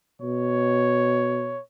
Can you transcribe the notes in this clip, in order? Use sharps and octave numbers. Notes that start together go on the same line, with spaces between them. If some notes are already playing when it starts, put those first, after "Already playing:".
B2 C#5